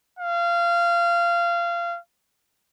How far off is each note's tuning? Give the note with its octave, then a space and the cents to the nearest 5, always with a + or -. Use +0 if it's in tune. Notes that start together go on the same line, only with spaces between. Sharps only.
F5 -20